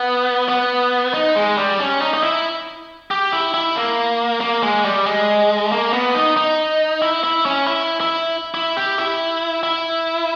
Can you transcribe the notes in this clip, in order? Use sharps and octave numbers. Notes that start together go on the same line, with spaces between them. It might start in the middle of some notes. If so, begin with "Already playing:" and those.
Already playing: B3
B3
D#4
G#3
G3
C#4
D#4
D#4
E4
G4
E4
E4
A#3
A#3
G#3
G3
G#3
A#3
B3
D#4
D#4
E4
E4
C#4
E4
E4
E4
G4
E4
E4